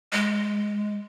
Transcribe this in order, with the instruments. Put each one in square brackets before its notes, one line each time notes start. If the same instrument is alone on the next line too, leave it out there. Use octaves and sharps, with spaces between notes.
[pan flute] G#3